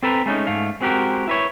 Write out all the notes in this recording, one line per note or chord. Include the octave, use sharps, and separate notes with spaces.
C4 A4 B4 A5 A#5
G#3 A3 C#4 D#4
G#2 A3 F5
G#3 C4 F#4 G4 A#4
E4 B4 C#5